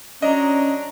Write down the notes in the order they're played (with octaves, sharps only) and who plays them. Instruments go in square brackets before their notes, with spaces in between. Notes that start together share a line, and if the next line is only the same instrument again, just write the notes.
[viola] F#3 A#5 [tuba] C#4 [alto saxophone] D4 [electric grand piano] D#5